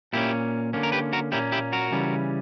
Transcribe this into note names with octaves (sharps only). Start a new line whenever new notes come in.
A#2 A#3 C#4 E4 G4
D3 A#3 C#4
A#4
G4 B4
F#4 A#4
A#2 A#3 C#4 E4 G4
E4 G4
F#4 A#4
C#3 E3 G3 C#4